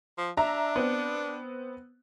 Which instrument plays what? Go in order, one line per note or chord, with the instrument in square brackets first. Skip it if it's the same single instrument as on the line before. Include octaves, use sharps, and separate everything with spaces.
[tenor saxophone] F3
[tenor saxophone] D4 [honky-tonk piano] E5 A#5
[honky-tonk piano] B3 C4